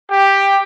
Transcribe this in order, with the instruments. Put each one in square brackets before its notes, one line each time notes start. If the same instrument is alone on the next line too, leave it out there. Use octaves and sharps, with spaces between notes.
[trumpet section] G4